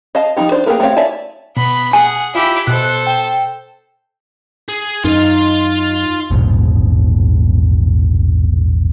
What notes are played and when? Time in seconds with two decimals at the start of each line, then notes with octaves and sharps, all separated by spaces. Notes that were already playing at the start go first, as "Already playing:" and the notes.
0.15 D#5 F5 A5
0.36 F3 G3 D#4 G4
0.52 D4 C5
0.66 A#3 G4 G#4 A#4 B4
0.80 A3 C4 G4 C#5 F5
0.96 C#5 D5 E5 G#5 A5
1.57 B2 B3 B5
1.93 G#4 F#5 G#5
2.35 E4 F4 G4
2.67 B2 A4 C5 F#6
3.07 G5
4.69 G#4
5.05 F#2 D#4 F4 F5
6.31 E1 A#1 G#2 B2